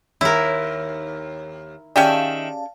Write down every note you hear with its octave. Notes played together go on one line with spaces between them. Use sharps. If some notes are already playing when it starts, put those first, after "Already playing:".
D#2 E4 A#4
D#3 C#4 G4 G#4 D5 E5 F5 A5